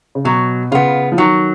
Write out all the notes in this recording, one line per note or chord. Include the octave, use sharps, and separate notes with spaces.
C#3
B2 F#3
C#3 B3 F4
F3
D#3 F#3